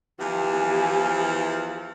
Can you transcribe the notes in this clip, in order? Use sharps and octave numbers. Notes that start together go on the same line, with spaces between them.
E2 E3 F3 G4 G#5